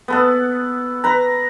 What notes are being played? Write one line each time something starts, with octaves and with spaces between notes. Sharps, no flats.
B3 A4 F#5
B4 A#5